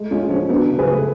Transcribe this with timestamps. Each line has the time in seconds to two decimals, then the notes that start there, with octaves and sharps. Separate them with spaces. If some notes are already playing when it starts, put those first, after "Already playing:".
Already playing: G#3 A3
0.11 G#3 C#4 F4
0.30 F3 C#4
0.49 F#3 B3 D4
0.69 C#3
0.79 G#4 B4
0.87 A3